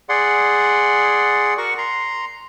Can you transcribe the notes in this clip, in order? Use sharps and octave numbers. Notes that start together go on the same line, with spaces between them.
G#4 D5 F#5 C6
F#4 A#4 F#5 C#6
A#5 C6